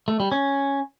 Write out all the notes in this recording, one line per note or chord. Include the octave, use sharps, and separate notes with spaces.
A3
G3
C#4